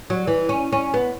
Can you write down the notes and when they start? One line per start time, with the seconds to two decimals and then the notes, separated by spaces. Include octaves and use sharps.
0.10 F#3
0.27 E3
0.49 C#4
0.72 C#4
0.94 B3